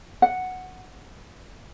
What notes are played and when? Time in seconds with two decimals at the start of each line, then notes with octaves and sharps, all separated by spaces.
0.22 F#5